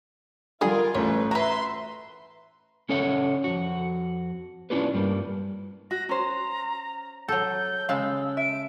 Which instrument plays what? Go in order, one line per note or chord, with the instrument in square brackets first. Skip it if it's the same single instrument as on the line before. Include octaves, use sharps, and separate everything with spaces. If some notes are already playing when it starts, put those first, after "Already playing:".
[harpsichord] D3 G3 C6 [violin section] F4 A#4 [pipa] G#4
[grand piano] A1 A3 [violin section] B4 [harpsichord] C#5
[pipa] F#4 B4 [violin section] E5 C6 [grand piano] A#5
[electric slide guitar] C#3 C#4 A4 C#5 E5 F#5
F2 F#4
C#4 D4 E4 F4 G4 B4
G2 G3 A#3
[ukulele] F#4 [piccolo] A#6
[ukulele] C#4 C5 [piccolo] A#5
[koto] F#3 A4 [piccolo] G6
[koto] C#3 G#3 A5 [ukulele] F5 [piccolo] E6
[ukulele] E5 [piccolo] D7